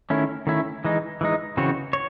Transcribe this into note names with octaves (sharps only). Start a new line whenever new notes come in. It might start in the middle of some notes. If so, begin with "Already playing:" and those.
D#3 A3 C#4 E4
D#3 A3 C#4 E4
E3 G#3 D#4
E3 G#3 D#4
C#3 E3 C4 F#4 C#5
C#5